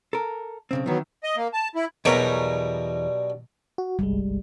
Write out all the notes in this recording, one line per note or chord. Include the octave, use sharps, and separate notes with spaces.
A4 A#4
B1 C#3 C4
D#3 E3 F#3 B3
D#5
A#3
A5
E4
E2 B2 F#3 G3 D4 A#4 C#5 A#5
F#4
G1 C2 G3 G#3